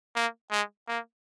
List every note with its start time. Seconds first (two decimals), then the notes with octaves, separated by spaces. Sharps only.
0.16 A#3
0.51 G#3
0.88 A#3